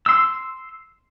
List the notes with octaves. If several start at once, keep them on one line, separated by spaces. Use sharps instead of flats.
C6 E6